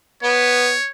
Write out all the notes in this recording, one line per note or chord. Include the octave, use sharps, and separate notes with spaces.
B3 C#5